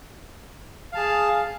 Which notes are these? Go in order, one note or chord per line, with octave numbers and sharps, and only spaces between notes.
G#4 F5 A5